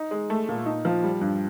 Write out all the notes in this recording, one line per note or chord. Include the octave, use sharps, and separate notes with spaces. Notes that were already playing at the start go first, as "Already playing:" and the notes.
Already playing: D#4
G#3
A3
A#2
D#4
F3
G3
G2